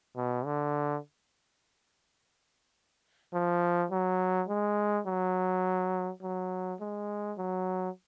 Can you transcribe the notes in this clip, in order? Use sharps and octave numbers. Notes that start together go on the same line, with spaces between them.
B2
D3
F3
F#3
G#3
F#3
F#3
G#3
F#3